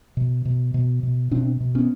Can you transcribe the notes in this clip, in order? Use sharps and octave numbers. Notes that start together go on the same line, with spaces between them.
B2
B2
B2
B2
B2 C4 D4
B2
B3 C#4